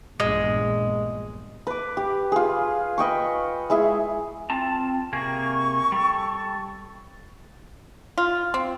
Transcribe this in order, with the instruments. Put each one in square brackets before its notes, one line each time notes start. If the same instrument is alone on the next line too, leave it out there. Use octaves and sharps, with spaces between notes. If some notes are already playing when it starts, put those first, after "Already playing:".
[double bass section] A#1 E2 G2 [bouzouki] G#3
[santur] B4 D6
G4
F4 G#4
B4 D#5 G5 C#6
G#3 E4 G#4
[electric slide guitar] C4 F4 A5
[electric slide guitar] C3 A#3 G#4 [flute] C#6
[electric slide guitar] G3 A4
[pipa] F4
C4